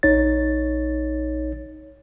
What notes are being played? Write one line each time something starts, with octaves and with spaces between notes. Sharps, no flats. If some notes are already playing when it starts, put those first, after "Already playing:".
A#1 D#4 C#5 A6